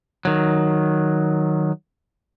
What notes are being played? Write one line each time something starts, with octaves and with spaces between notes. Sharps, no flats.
D#3 F#3